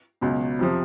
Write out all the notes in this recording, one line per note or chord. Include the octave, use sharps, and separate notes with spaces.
C#2 B2 F#3
F2 C3 F3